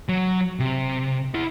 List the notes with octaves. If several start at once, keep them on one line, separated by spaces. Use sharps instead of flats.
F#3
C3
E4 F#5